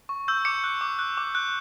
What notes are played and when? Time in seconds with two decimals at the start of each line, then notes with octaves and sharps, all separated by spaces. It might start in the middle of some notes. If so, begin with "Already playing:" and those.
0.09 C#6
0.28 E6 G6
0.45 D6 C#7
0.64 F#6
0.81 D6
0.99 F#6
1.18 D6
1.35 F#6